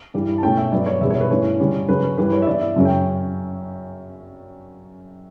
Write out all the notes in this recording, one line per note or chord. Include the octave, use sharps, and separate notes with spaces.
G2 E3 G3
A5
B2 A3 C#4 G5
E5
G2 F#3 B3 D5
C#5
E2 B2 G3 B3 E5
C#5
B4
G2 E3 A3 C#4 C#5
G2 D3 G3 C#4
C#3 F#3 C#4 B4
C#5
G2 E3 G3 B4
C#5
E5
G2 E3 B3 D5
E5
F#2 C#3 F#3 C#4
G5